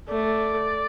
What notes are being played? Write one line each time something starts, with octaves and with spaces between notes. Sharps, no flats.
A3 D5